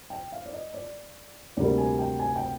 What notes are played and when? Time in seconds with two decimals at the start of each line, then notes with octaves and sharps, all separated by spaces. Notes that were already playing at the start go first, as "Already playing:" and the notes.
0.10 G5
0.32 F5
0.46 D5
0.53 D#5
0.74 D5
1.57 D2 C3 G3 A#3 D5
1.78 G#5
1.99 G5
2.19 G#5
2.36 G5